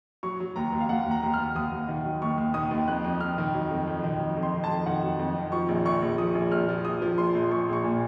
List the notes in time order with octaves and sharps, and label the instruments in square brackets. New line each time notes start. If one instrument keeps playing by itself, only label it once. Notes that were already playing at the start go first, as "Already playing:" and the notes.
[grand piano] F#3 C#6
F#3
D#2 A#5
D#2
F5
D#2 F#5
D#2 A#5
D#2
D#2 F6
D#2 D#6
D#2
D#3
F#3
D#2 C#6
D#2
D#3 D#6
D#2
F2 F#6
F2
F2 F6
D#3
F#3
F2
F2
D#3
F#3
F2
C6
D#3
A5
F2
D#3 F#5
F#3
F2
D#3
F3 C#6
A#1
A#1 C#6
A#1
F3 D#6
A#1
A#1 F6
F3
A#1 D#6
F3
A#1 C6
A#1
A#1 C#6
A#1 C#6
A#2